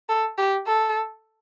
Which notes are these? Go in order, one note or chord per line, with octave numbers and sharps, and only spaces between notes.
A4
G4
A4